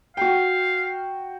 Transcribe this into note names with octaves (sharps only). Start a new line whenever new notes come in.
F#4 F5 G5